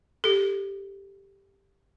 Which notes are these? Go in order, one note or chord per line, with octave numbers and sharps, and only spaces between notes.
G4 A4